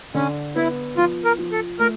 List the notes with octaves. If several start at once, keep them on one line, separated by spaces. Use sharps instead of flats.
D3 C#4
B3 E4
F3 F4
A#4
F3
A4
A3 A#4